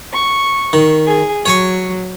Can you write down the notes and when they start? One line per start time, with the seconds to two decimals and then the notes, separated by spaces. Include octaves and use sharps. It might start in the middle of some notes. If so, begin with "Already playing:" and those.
0.13 C#6
0.73 D#3
1.06 G#4
1.46 F#3 C#5 G#5 C#6